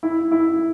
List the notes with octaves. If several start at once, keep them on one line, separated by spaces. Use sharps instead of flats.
E4
E4